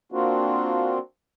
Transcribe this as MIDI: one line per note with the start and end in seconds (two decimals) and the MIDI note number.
0.12 0.98 58
0.12 0.98 60
0.12 0.98 62
0.12 0.98 65
0.12 0.98 66